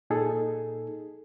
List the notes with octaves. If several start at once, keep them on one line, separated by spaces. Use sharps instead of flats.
A#2 D#4 G#4 A4